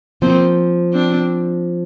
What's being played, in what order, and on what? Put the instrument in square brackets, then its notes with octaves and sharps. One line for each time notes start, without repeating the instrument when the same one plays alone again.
[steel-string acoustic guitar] F3 [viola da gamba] A#3 C4
[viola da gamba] C4 D4